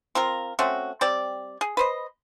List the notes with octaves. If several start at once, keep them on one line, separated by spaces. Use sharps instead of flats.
C4 F4 A#4
A3 C4 C#4 F#4
G3 C4 D5
G#4
B4 C5 D#5